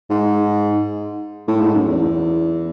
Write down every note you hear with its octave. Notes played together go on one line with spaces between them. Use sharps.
G#2
A2
G#2
F#2
E2